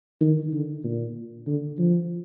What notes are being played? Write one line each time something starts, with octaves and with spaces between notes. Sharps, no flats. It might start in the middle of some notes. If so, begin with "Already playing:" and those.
D#3
D3
A#2
D3
F3